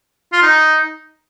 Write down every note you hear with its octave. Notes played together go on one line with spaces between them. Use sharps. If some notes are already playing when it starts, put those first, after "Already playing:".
F4
D#4